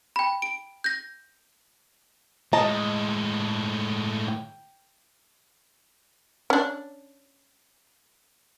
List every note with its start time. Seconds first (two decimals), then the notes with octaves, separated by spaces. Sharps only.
0.16 G5 B5
0.42 D7
0.84 G6 A#6
2.53 A2 G#3 D#5 A5 A#5
4.28 G5
6.50 C#4 D4